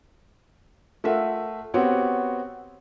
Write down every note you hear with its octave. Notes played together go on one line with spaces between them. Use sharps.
A3 F4 A#4 E5 F#5
B3 C4 F#4 G4 C#5